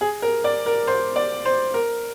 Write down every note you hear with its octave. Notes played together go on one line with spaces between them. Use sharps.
G#4
A#4
D5
A#4
C5
D5
C5
A#4